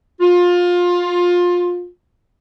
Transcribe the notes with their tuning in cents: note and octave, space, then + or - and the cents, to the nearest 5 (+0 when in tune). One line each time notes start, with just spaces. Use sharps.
F4 +20